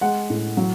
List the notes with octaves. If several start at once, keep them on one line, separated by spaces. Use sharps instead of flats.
G#3 F#5
A2
F#3